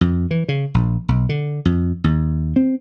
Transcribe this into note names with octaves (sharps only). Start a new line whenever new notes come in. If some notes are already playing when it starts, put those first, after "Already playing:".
F2
E3
C#3
A#1
B1
D3
F2
D#2
C4